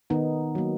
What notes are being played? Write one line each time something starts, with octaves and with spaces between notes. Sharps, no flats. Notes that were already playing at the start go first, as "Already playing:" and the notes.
D#3 B3 D#4
F#3 A#3